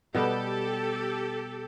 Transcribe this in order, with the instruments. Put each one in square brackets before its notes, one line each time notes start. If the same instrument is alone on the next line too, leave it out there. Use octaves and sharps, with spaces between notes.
[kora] B2 G3 B3 [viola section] G4 A4